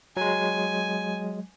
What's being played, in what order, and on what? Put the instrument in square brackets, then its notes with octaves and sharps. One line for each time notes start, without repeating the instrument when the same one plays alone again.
[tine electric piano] F#3 G#3 [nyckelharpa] G#5